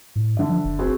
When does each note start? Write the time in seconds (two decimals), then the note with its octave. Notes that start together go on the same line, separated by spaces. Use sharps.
0.16 A2
0.37 D3 E5
0.49 F3
0.65 F#1
0.79 C4 F#4 G#4